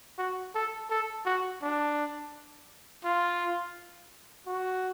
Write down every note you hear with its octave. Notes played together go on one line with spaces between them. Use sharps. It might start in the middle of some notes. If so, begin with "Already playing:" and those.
F#4
A4
A4
F#4
D4
F4
F#4